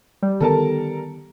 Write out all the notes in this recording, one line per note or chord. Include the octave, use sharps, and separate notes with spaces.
G3
D3 D#3 B3 A4 A#4 A5